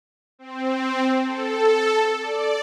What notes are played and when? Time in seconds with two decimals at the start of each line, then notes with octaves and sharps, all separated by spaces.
0.39 C4
1.24 A4
2.21 D5